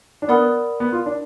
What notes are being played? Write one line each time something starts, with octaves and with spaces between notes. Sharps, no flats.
D4
B3 A#4 D5 F#5 B5 D#6
B3
F4
D4